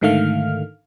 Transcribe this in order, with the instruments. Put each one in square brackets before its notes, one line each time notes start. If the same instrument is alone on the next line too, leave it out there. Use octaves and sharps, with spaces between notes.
[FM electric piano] G#2 D3 D#3 A3 F5 F6